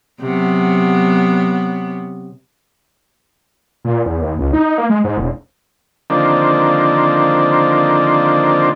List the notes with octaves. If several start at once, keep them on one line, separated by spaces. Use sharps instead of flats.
C3 F#3 B3
A#2
E2
D#2
C#2
D#4
A#3
G#3
G#2
E1
D3 D#3 F3 A#3 C4 D4